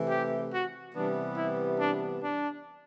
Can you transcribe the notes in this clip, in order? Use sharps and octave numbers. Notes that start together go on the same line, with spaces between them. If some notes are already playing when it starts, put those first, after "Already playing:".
Already playing: C3 E3 A3
G4
F#4
C3 E3 G3 B3 D4
E4
D4
D4